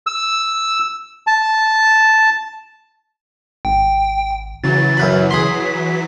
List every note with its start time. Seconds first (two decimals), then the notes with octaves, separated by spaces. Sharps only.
0.07 E6
1.27 A5
3.65 G#1 G5
4.64 C#3 E3 F#3 A6
4.97 F#2 B4 B5
5.31 G#4 B5 C6 B6